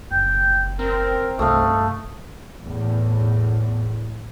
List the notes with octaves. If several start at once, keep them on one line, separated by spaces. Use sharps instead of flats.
F#1 G5
C4 A#4
C2 G2 A3 D#5 F5
E2 A2